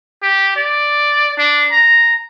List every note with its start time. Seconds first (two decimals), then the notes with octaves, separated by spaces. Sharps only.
0.23 G4
0.56 D5
1.38 D4
1.72 A#5